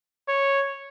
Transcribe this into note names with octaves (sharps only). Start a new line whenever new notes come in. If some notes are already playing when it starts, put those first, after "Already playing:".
C#5